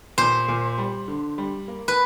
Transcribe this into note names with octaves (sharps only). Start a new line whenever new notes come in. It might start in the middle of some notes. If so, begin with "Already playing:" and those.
A#2 C5
A#2
G3
D3
G3
A#3
B4